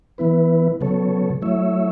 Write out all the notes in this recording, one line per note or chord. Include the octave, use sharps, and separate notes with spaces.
E3 B3 E4 B4
C#3 F#3 B3 A4 C#5
F#3 A3 E4 C#5 E5